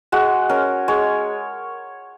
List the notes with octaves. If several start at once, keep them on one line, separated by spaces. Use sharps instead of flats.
G#3 F#4
C#4 A#4
G#3 C#5